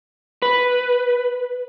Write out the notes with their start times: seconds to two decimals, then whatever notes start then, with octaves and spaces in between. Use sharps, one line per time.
0.42 B4